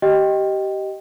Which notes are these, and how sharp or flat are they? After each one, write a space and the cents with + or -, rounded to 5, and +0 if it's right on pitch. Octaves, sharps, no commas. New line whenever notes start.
G4 -20 D#5 +0 G5 +0